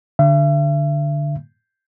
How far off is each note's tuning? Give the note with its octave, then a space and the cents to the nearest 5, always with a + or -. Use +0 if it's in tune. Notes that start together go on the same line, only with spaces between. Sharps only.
D3 +0 E5 +40